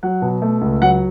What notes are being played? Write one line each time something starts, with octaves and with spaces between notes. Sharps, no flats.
F#3 F#5
B2
A3
C#2
F#3 F#5